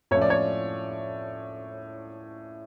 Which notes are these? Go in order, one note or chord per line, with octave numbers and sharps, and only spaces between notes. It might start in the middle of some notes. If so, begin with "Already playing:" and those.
A2 F3 C#4 C#5
D5
C#5